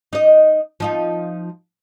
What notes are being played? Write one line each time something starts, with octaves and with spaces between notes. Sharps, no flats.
D#4 D#5
F3 D#4 F4